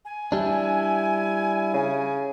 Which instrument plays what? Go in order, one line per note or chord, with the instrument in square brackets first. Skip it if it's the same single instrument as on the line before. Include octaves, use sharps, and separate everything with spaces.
[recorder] G#5
[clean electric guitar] G3 D4 [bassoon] E4
[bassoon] C#3